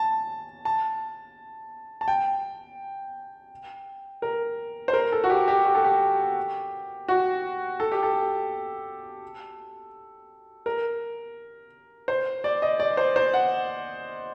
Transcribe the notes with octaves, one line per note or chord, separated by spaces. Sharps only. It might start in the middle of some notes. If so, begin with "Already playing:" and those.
Already playing: A5
A5
A5
G5
A#4
C5
A#4
A4
F#4
G4
G4
G4
A4
G4
F#4
A4
G4
A4
A#4
C5
D5
D#5
D5
C5
C5
F#5